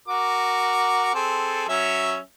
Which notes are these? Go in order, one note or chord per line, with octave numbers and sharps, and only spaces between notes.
F#4 A#4 D6
C4 G#4 A4
F#3 C#4 E5